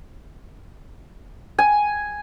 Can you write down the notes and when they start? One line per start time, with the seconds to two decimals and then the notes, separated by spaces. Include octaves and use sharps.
1.58 G#5